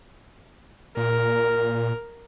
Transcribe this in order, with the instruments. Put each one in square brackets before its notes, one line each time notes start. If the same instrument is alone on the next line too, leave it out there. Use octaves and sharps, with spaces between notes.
[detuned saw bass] A#2 [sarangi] A#4